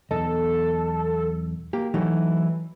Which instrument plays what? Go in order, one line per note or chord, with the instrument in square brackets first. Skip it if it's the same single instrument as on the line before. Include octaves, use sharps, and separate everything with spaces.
[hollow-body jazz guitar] B1 E2 D#5 [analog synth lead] A4
[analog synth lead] A#3 [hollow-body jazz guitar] G4
[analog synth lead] E3 [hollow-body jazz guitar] F#3 A3 D#4